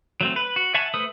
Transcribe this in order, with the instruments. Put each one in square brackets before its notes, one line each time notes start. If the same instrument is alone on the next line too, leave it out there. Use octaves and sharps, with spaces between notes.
[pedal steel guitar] F#3 A3 C4
B4
F#4
E5 F#5 G#5 A5 C#6
A3 B4 C5 E5 D#6